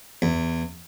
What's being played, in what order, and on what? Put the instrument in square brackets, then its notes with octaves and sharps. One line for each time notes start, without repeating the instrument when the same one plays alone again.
[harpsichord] E2